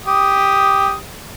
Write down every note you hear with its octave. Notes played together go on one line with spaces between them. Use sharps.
G4 D#6